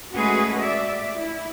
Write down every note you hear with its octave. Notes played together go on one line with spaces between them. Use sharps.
G#3 A3 C#4 F#4 G#4 B4
D5 E5
E4